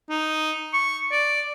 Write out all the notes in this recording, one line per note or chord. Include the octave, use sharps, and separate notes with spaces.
D#4
C#6
D5